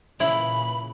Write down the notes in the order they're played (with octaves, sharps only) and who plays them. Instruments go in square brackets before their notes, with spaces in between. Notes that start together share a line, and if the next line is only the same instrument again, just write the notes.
[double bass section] A#2 C#3 E3 [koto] E4 [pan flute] B5